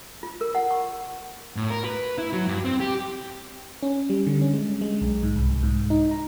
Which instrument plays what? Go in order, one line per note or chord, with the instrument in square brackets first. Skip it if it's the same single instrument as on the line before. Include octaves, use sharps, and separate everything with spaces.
[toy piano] F4
A#4
F#5
C#6
[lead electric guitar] A2
A#4
B4
E4
F#3
G2
C4
G4
[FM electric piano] C#4
G3
D3
C#4
G#3
G#3
B1
G#2
C2
G#2
D#4
A#5